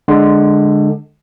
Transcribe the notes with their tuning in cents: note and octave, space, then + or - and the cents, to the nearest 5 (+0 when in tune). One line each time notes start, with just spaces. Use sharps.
D3 +10 G#3 +0